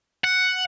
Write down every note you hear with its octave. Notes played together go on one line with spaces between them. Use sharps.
F#5